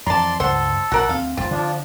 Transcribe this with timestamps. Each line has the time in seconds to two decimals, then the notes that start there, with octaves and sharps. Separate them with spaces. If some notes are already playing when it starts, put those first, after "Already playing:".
0.06 F2 E3 D5 A5 A#5 C6
0.40 C#2 G2 A4 C5 F#5 C6
0.92 B1 F#4 A#4 F#5
1.09 D2 C4 F5
1.37 D#1 B1 G3 C4 F4
1.51 D3 F3 D4